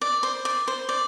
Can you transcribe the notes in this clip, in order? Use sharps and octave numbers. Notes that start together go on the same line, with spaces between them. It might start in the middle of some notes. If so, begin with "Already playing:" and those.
D5
C5
D5
C5
D5